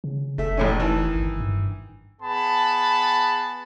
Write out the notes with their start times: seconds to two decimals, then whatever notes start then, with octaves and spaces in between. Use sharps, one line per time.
0.04 C#3
0.38 F1 A3 E5
0.57 A1 A2 C#4
0.79 D#3 E3 A5
1.16 G1
1.40 G2
2.20 B3 G#4 A5 B5